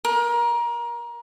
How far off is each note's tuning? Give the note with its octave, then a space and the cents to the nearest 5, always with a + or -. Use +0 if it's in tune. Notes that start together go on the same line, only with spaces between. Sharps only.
A#4 +25